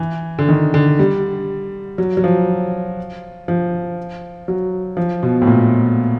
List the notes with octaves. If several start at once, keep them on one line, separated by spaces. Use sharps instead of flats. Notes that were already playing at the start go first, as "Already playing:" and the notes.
Already playing: E3
D3
D#3
D3
G3
F#3
F#3
F3
F3
F#3
F3
B2
A2
A#2